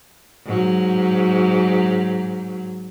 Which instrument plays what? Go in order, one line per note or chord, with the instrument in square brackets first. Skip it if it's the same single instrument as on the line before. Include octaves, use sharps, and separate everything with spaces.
[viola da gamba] G#2 F#3